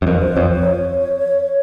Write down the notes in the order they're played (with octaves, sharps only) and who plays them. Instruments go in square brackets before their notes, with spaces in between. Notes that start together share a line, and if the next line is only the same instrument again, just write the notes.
[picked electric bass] F#2
[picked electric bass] F2 [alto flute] A#4
[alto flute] C5
[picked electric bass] F2 [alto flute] C#5
[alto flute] C#5